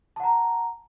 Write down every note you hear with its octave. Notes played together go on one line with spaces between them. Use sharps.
F#5 A5 A#5